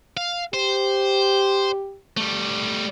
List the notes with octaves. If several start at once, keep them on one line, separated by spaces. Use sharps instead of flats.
F5
G4 C5
G3 A3